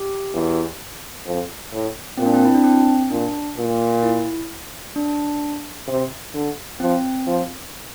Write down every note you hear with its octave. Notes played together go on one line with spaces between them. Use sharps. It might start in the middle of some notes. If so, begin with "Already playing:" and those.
Already playing: G4
E2
F2
A2
A#2 C4
D4
C4
E4
D4
C4
A#2 D4
A#2
E4
D4
C3
D3
F3 C4
F3